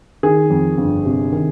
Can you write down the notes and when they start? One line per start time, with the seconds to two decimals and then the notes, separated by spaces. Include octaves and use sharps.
0.23 D#3 G#4
0.50 F2
0.78 G1
1.05 C3
1.32 D#3